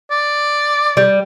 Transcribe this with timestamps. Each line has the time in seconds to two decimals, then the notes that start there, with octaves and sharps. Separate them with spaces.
0.11 D5
0.97 G3